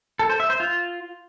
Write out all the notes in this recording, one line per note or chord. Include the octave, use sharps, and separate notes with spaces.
A4
C5
E5
C5
F4